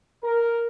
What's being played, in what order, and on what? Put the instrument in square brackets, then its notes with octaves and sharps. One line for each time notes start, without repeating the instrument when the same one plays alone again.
[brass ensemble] A#4